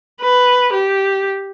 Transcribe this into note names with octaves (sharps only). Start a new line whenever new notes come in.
B4
G4